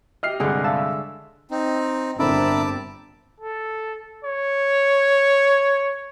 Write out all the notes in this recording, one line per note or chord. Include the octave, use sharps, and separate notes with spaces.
G4 D#5 E5 F6 C7
C2 G2 D3 G#3 G#4 F#5
E5 F5 A5
C4 D#4
G1 D3 C4 A#4 E5 A5 B5 D6
A4
C#5